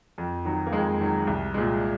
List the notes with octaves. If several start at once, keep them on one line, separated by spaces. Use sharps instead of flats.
F2
D#3 F#3
A#3
F2 G#3
D#3 F#3
C2
A#2 G#3